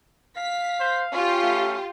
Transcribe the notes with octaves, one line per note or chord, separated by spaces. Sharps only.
F5 B6
C5
C#4 F4 G4
A3